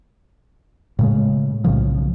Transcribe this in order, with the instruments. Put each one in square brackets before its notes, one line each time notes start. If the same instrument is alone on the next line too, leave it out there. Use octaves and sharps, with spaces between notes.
[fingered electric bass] A2 C#3 G#3
B1 A2 C#3 F3